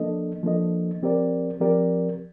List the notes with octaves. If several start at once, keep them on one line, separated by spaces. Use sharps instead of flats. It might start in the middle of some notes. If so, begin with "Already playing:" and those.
Already playing: F3 A#3 D4 A4 D#5
F3 A#3 D4 A4 D#5
F3 C4 G4 A#4 D5
F3 C4 G4 A#4 D5